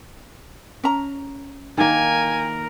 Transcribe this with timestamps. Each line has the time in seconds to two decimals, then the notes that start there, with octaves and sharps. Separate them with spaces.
0.84 C#4 A#5
1.78 D#3 A#3 A#4 G#5